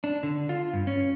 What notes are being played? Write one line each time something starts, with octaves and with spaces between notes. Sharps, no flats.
D4
D3
F4
G2
C#4